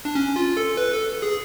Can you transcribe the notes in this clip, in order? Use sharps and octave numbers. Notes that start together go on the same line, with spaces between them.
D4
C#4
F4
A4
B4
A4
G#4